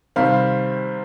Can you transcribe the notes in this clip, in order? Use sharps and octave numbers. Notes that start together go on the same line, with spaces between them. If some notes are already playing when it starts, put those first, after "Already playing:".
C3 D#3 G3 C4 F5